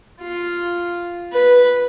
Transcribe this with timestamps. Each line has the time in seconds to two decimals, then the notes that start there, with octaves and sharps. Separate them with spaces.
0.20 F4
1.33 B4